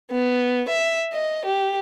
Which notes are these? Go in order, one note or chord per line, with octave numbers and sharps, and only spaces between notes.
B3
E5
D#5
G4